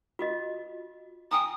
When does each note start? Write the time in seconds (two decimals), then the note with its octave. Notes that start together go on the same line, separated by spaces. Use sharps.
0.19 F4 F#4 D#5
1.31 G5 G#5 A#5 D#6